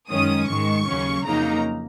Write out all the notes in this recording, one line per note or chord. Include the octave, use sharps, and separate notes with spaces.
F#2 D#3 G#3 C#4 D#6
G#2 D#3 G#3 C#6
D#2 C#3 F#3 C#4
F2 C#3 F#3 A#3 D#4 A#5